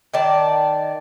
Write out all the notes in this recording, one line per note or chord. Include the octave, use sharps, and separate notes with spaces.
D#3 D5 A5